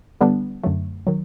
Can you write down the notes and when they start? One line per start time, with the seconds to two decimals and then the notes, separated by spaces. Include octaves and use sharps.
0.21 D3 G3 B3 D4
0.63 F#2 D3 F#3 A3
1.07 D#3 F#3